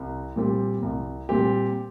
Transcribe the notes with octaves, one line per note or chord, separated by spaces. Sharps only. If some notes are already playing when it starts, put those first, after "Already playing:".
Already playing: C2
A#2 G3 C4 G4
C2
A#2 G3 C4 G4